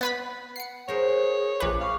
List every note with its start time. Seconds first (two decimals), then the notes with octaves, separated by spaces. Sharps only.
0.01 B3 B4 B5
0.56 F#5 C7 C#7
0.88 G#4 A#4 C5 C#5
1.60 A#1 B4 D6
1.81 F5 C#6